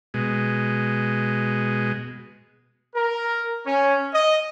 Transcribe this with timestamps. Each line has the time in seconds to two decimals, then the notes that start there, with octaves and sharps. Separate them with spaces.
0.14 B2 G#3
2.95 A#4
3.66 C#4
4.14 D#5